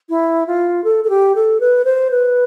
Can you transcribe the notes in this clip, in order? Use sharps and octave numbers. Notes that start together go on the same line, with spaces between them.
E4
F4
A4
A4
G4
A4
B4
C5
B4